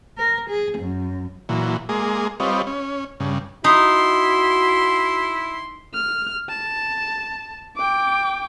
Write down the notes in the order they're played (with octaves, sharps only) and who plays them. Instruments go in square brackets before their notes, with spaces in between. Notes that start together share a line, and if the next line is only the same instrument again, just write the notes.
[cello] A#4
G#4
F#2
[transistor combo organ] A#2 E3 F#3
G#3 A#3 G#4
G3 C4 F4 B4 C#5 D#5
C#4
G2 C#3
[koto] D#4 [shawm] E4 [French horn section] F#4 [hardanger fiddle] C6
[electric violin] F6
A5
G5 D6